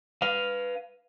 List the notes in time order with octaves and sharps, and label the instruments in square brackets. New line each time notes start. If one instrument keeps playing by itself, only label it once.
[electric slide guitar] B4 F5